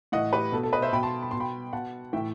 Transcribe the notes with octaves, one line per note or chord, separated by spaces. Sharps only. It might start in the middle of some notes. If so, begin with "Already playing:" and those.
A2 E3 D#5 F#5
G4 B4
B2 A4
A4
B4 D#5
C5 E5
B2 G5 B5
A5 C6
B5
B2 C6
G5 B5
B2 F#5 A5
A2 E3 E5 G5